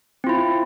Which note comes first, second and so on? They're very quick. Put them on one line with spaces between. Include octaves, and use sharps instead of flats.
C4 F4 E4